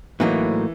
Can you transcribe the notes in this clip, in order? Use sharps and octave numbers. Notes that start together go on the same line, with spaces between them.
A2 E3 F#3 A#3 D#4